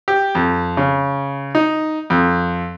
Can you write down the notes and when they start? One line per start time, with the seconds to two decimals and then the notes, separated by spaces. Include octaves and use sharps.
0.08 G4
0.35 F2
0.77 C#3
1.55 D#4
2.10 F2